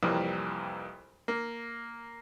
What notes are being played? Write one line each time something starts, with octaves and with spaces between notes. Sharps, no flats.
C2 F2 E3 G3 A#3
A#3